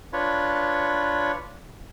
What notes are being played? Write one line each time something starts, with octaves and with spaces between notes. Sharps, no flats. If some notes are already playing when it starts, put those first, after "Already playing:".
D4 F4 B4 C#5